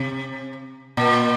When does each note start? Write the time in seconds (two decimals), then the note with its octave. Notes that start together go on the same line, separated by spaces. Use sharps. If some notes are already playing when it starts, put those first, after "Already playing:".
Already playing: C3
0.97 A#2